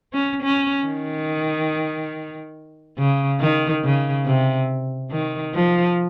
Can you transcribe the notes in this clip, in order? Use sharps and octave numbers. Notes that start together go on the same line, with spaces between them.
C#4
C#4
D#3
C#3
D#3
C#3
C3
D#3
F3